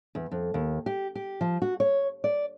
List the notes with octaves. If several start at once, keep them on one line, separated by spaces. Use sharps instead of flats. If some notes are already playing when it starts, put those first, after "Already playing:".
E2
F2
D#2
G4
G4
F3
F#4
C#5
D5